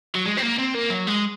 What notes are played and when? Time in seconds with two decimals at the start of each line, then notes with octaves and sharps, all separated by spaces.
0.15 F#3
0.25 G#3
0.37 C4
0.42 A#3
0.58 C4
0.74 A#3
0.90 F#3
1.07 G#3